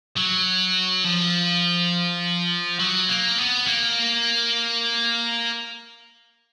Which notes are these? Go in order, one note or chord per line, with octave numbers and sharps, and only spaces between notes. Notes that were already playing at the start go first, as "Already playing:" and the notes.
F#3
F3
F#3
A#3
B3
A#3